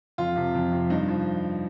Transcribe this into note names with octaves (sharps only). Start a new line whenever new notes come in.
F2 F4
C3 F3
F2
C3 F3
G2 D#4
F3